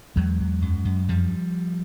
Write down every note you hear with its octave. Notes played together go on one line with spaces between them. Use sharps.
E2 F#3 G#3
E2
F#2
F#2
F2 F3 G3